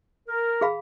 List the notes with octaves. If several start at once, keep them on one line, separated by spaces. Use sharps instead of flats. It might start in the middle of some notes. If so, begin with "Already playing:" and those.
A#4
G#4 F5 B5